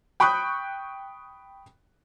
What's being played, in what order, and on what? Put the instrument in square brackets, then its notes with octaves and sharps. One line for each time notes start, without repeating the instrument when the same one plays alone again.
[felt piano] G5 B5 C#6 D#6 F#6 G6